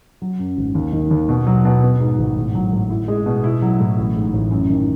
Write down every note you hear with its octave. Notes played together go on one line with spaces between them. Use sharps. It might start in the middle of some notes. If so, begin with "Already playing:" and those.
F#3
F#2
G#1
D#2
D#3
D#2
B2
F#3
B2
B3
G#2
G#1
A2
F#3
A2
E4
G#3
B2
E4
F#3
A2
A1
G#2
A1
F#2
D#3